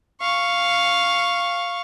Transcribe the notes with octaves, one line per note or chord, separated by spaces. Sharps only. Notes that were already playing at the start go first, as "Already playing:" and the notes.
F5 C#6